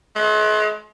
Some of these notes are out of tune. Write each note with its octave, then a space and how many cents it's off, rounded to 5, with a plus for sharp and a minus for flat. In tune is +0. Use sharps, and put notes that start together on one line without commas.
G#3 +45